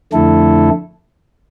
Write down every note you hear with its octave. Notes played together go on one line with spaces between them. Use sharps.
F2 D3 A3 E4 A4